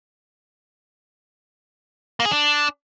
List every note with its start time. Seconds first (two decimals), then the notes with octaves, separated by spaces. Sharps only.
2.20 A#3
2.25 G#4
2.31 D4